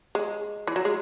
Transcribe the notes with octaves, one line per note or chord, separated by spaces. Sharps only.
G#3
E3
F#3
G#3